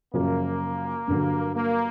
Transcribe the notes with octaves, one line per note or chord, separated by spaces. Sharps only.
F#2 C#3 F3 A#3
G2 D3 F#3
A#3